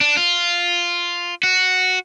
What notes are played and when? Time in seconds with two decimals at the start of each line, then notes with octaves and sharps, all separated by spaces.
0.01 D4
0.17 F4
1.43 F#4